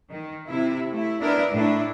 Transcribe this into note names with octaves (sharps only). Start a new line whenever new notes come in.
D#3
C3 E4
A3 E4
B3 D4 E4 A#4 D5
A2 A3 D4 E4